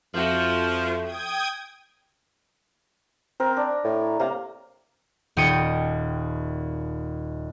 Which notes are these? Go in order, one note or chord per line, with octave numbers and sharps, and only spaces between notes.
F2 F3 A3 F#4
G5 D#6 G#6
C4 A#4
D4
A2
C3 A#3 F5 A#5
D#1 D#2 G5 D#6 C#7 D#7